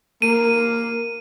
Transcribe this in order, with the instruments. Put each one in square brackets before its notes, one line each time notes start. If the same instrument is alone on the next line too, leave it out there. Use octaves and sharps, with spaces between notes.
[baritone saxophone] A#3 [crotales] D#7